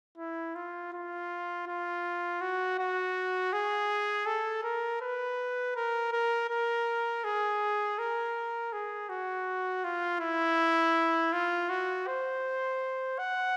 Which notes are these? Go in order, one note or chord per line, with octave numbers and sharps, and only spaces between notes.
E4
F4
F4
F4
F#4
F#4
G#4
A4
A#4
B4
A#4
A#4
A#4
G#4
A#4
G#4
F#4
F4
E4
F4
F#4
C5
F#5